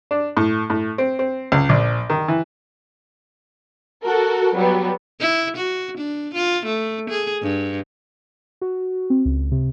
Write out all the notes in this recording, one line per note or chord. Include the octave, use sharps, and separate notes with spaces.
D4
A2
A2
C4
C4
C#2
A#1
D#3
E3
F#4 A4 A#4
F#3 G3 B3
E4
F#4
D4
F4
A3
G#4
G2
F#4
C4
C#2
C3